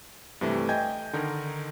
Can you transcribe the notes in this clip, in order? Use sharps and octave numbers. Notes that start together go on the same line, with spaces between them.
G2 C3 E3 G3 A3
D#5 G5 G#5 G6 G#6
D3 D#3 D#4 A#4